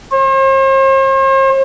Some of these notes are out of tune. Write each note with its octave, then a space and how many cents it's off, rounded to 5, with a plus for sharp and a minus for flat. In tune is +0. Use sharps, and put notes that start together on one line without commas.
C5 +45